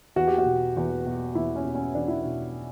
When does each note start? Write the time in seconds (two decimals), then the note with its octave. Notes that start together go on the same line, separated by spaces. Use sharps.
0.16 E2 F#4
0.27 G4
0.38 F#4
0.46 B2
0.77 E2
1.06 B2
1.35 E2 E4
1.56 C#4
1.65 B2
1.75 C#4
1.95 E2 D4
2.08 E4
2.22 B2 D4